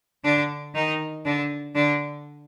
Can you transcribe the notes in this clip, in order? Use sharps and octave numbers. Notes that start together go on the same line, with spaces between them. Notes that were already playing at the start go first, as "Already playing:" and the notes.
D3 D4
D#3 D#4
D3 D4
D3 D4